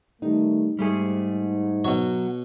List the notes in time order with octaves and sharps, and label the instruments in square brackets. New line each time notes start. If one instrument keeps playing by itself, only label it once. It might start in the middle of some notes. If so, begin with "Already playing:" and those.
[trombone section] D#3 G3 A3 [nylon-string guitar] D#4
[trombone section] G#2 [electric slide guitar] G3 A3 G#4
[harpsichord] B2 C#5 [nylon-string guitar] F#3